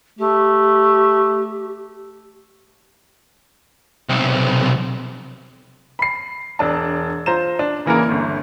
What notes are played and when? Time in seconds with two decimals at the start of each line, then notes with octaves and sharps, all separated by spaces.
0.19 A3 G4
4.09 B1 C3
5.99 B5 C7
6.59 E1 D4 A5
7.26 F4 C5 A#5 E7
7.59 D4
7.86 C#3 E3 A#3 E4 G#4 A#4
8.09 G1 D2